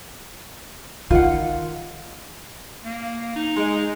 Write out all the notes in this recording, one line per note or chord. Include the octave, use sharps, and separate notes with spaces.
D#3 F4 F#5
A#3
D#4
G#3